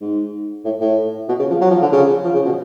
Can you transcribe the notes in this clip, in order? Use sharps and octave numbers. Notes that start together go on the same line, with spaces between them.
G#2
A2
A2
B2
C#3
F3
F#3
F3
D3
C#3
F3
C#3
B2